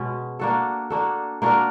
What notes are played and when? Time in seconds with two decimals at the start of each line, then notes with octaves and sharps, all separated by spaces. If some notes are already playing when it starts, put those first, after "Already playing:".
Already playing: B2 G#3 C#4
0.39 A#3 D4 F#4 A4
0.90 A#3 D4 F#4 A4
1.42 A#3 D4 F#4 A#4